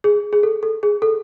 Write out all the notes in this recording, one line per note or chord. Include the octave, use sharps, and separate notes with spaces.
G#4
G#4
A4
A4
G#4
A4